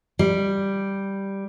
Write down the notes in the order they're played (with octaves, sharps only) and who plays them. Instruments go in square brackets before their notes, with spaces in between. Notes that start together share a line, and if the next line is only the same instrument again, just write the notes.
[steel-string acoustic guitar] G3